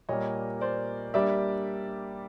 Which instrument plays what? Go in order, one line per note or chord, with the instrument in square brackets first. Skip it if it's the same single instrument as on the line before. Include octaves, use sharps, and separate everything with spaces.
[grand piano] A#2 G3 A#3 [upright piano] C#5 D#5
[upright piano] C5 D5
[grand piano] G3 A#3 D4 G4 [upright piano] D5 E5